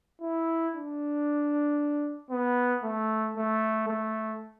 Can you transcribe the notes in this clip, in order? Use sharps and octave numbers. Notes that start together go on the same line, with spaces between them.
E4
D4
B3
A3
A3
A3